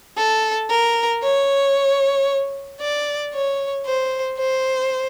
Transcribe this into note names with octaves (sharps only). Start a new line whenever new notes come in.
A4
A#4
C#5
D5
C#5
C5
C5